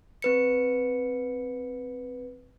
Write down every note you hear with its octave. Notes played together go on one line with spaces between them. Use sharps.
C4 B4 C#7